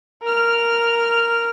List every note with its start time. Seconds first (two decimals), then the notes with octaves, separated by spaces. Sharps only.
0.22 A#4 F6